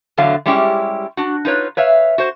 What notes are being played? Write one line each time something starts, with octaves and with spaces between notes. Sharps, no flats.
E2 A2 D3 F#3 F5
G3 G#3 C#4 E4 G4
D4 F#4
D#4 F4 B4 C#5
B4 C#5 E5 F5
F#4 C5